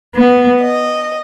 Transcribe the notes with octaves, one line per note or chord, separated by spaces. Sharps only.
B3
D#5